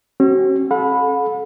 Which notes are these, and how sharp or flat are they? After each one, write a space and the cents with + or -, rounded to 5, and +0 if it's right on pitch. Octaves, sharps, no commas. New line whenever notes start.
C#4 -45 F#4 +35
A4 -30 F#5 -40 B5 +0